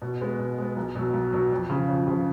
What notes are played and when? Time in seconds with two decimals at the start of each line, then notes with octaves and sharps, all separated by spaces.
0.02 B2
0.21 G#3 B3
0.39 B2
0.58 G#3 B3
0.77 B1
0.95 B2 F#3
1.14 B1
1.33 B2 F#3
1.52 F2
1.70 C#3 F3
1.88 F2
2.07 C#3 F3